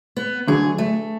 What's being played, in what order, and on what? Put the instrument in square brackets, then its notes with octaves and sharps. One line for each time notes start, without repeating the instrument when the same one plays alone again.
[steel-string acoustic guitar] B3
[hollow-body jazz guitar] D2 D3 F#3 [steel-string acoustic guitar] G#4
[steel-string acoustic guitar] A3